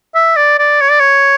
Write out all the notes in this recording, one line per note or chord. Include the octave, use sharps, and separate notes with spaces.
E5
D5
D5
C#5
D5
C#5